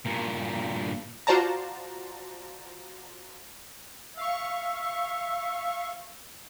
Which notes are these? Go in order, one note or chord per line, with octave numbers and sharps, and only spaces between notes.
G2 A#2
F4 F#4 C5 D5 A5 A#5
E5 F5 C#6